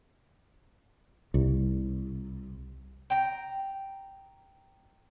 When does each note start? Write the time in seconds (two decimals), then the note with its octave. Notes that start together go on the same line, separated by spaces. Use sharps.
1.34 C2
3.10 G5 A#5